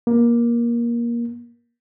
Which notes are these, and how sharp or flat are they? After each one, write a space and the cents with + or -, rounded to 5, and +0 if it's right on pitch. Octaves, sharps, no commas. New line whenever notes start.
A#3 +20